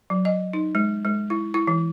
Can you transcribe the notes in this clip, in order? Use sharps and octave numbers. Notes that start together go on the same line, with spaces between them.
F#3
D#5
D#4
G#3
G#3
E4
E4
E3